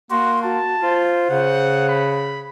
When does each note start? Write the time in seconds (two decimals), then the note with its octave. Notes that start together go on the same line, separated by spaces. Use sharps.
0.11 A#3 F#4 C6
0.44 F#4 A5
0.82 F4 C5
1.30 C#3 F#5
1.89 B5